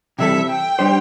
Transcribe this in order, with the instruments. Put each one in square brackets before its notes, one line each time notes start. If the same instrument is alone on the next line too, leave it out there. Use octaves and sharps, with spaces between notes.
[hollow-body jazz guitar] C3 E3 G3 C4 A4 [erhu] E5
[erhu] G5
[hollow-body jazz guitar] G3 D4 C5